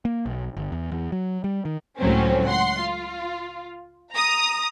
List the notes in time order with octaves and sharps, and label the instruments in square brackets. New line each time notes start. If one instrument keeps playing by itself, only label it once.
[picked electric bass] A#3
B1
G1
E2
E2
F#3
G3
D#3
[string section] C#2 A2 F#3 C4 C#4
F#5 C6
F4
A#5 D#6